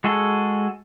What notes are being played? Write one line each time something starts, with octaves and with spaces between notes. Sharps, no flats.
G#3 F#4 G#4 A4